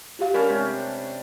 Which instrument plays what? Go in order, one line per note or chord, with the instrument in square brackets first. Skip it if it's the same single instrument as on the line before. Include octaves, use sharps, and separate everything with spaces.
[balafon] F4 G4 F5
[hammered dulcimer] G3 C#4 D4 [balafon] A#4
[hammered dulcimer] C3 [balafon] G#3